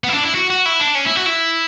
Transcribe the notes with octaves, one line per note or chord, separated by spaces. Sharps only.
B3
E4
D4
E4
F#4
F#4
E4
D4
C#4
E4
F#4
E4